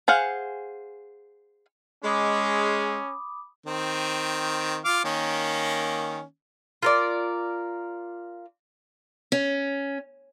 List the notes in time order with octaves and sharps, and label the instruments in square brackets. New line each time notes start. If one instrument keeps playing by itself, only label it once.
[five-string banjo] G#4 C5 F5 F#5
[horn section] G#3 [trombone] C#4 [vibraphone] B5 D6 D#6
[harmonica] D#3 C4
F4 F5 D6
D#3 A#3 C#4
[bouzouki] F4 A#4 D5
[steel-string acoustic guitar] C#4